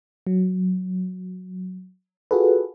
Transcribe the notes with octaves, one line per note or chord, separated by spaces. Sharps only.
F#3
F4 F#4 G#4 A4 B4